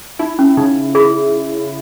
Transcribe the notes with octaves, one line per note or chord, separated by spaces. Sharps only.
D#4 E4
C#4
C#3 D#4
E4 G#4